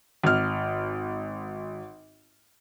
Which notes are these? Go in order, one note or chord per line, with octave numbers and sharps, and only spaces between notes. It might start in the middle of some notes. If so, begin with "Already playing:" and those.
G#1 F6